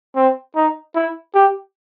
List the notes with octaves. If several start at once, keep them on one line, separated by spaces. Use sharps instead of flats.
C4
D#4
E4
G4